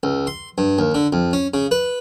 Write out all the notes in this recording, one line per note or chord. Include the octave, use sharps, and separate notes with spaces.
C#2
C6
G2
D#2
D3
F2
C#4
C#3
B4